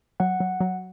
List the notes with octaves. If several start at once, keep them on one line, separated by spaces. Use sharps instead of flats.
F#3 F#5
F#3
F#3